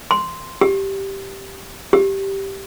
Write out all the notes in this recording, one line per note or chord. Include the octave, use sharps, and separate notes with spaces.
C6
G4
G4